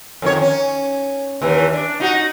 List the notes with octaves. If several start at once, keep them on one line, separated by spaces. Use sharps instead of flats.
F2 D#3 C#5
C#4
D#2 E3
D4
D#4 F4 F#4